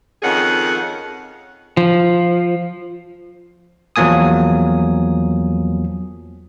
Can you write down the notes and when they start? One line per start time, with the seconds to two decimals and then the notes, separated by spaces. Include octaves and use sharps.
0.22 F2 D#3 C#4 G#4 F#5
1.77 F3
3.96 E2 F3 F#3 A#3 G#5 D#6